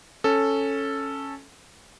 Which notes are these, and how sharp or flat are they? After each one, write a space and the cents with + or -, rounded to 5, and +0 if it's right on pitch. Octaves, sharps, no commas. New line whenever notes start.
C#4 -5 A4 +0